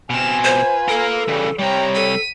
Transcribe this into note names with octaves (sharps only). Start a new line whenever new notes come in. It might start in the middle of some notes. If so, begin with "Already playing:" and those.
B2 C4 G#5 F6 E7
F4 B4 C5
A4 A#4 F5
C#3 E3 G3
C3 G3 C#5 G5 A#5
A4 B6 D#7